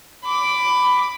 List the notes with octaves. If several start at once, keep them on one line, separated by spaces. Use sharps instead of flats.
B5 D6